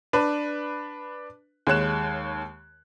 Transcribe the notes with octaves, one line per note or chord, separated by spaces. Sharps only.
D4 B4
D#2 G#3 C#5 F#6 E7